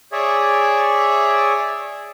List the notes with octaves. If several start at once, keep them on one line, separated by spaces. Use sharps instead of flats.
G#4 C#5 D5 E5